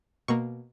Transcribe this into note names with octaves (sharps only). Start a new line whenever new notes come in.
B2 A#3 C#6